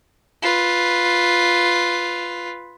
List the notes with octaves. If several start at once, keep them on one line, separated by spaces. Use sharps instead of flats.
F4 B4